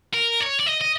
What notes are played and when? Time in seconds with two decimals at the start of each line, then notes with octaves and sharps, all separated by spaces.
0.14 A#4
0.40 C#5
0.59 D5
0.66 D#5
0.81 D#5